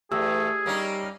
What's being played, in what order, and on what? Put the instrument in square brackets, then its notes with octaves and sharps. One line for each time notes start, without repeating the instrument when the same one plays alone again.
[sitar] E2 [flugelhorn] A3 [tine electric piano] G4 E6 [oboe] G#4
[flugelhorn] G3 [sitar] A#3 C#4 D#4